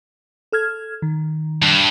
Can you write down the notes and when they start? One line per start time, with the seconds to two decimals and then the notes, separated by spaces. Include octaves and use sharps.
0.52 A4 F6 G#6
1.02 D#3
1.62 G2